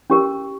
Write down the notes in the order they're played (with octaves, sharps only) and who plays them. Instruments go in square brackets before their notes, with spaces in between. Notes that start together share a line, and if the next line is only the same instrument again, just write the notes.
[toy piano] C#4 G4 A#4